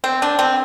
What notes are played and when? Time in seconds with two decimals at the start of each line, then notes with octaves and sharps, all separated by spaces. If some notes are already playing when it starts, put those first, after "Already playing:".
0.04 C4
0.22 D4
0.39 C4